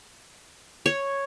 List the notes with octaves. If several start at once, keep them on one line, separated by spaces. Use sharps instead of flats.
C#5